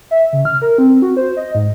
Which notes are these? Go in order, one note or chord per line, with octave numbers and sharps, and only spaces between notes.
E5
C#3
F6
A#4
C4
F#4
C5
D#5
G#2